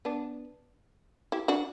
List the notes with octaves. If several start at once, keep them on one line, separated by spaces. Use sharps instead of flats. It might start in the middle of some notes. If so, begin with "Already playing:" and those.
B3 D4
E4 G4
D4 F#4